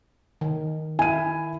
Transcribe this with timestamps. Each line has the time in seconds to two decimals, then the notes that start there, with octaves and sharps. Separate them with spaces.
0.41 D#3
0.99 E4 G#5 D#7